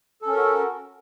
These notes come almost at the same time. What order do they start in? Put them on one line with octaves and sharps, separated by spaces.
A4 C#4 A#4 F#4